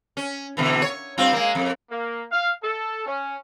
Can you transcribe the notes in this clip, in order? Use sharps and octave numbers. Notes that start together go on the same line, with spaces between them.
C#4
B2 D3 E3
C#5
G2 C4 F4
G#3 A#3
F2
A#3
F5
A4
C#4